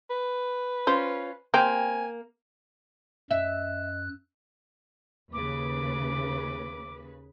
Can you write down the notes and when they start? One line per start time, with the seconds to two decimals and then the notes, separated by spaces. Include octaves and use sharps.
0.10 B4
0.87 C#4 F4 C5
1.54 A#3 C4 G4 G#5
3.31 F#2 D#5 E5 F#6
5.33 D#2 C#3 B4 D6